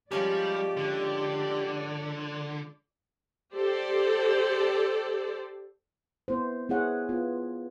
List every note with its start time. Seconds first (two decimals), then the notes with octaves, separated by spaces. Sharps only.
0.11 F3 G3 G#3 C#4 G4 D5
0.77 D3
3.55 G4 A4 C5 D5
6.28 B3 E4 C5
6.69 B3 E4 G#4 C#5 F#5
7.09 B3 F4